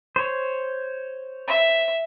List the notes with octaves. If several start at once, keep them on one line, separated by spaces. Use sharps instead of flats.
C5 C#5
E5